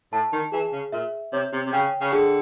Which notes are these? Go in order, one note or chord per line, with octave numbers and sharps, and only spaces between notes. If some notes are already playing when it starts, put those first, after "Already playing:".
A2 A5
D#3
E3 G#4
C#3
A#2 E5
C3 C#5
C3
C3
C#3 G5
C#3
D3 G#4